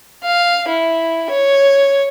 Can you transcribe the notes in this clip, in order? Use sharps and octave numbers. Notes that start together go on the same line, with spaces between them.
F5
E4
C#5